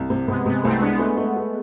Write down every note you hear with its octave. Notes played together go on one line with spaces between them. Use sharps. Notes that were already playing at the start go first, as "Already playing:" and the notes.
Already playing: C2
C3
C3 G#3 B3
C3 G#3 B3
C2 A3 C4
G#3 B3 D4
A3
A3
A3